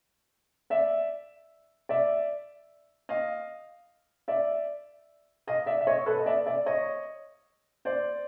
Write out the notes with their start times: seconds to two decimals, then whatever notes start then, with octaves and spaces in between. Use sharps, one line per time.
0.70 D5 E5
1.89 D5 E5
3.09 D#5 F5
4.28 D5 E5
5.47 D#5 F5
5.66 D5 E5
5.81 E5
5.87 C#5 D#5
6.06 A4 B4
6.18 D#5
6.26 D5 E5
6.46 D5 E5
6.66 C#5 D#5
7.85 C5 D5